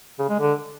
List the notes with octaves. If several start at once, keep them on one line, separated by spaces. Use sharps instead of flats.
C#3
G#3
D3